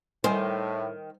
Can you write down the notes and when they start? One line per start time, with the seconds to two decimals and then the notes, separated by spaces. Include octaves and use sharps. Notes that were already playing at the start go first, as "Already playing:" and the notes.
0.24 A2 D#3 G3 C5 G#5 C6